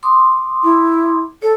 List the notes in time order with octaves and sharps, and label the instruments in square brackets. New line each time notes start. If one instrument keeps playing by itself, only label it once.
[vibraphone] C6 D6 D#6
[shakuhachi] E4
[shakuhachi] A4 [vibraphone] C#5